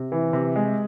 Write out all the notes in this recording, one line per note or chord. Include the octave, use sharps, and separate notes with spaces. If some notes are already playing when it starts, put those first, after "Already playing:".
Already playing: C3
E3
C3
G#3